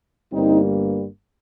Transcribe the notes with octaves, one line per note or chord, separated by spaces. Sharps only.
G1 G2 G3 A#3 C4 D#4